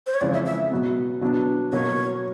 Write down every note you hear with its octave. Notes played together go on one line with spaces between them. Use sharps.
C5
C#5
F2 C#3 E3 G#3 D5
E5
E5
B2 F#3 B3
B2 F#3 B3 D4
B2 F#3 A#3 C#5